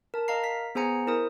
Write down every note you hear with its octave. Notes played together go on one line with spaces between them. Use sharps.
A#4 A5
A#4 D#5 F5 A#5 C7
B6
B3 G#4 C5 G#5 A#5 C#7
E4 A#4 C5 D#6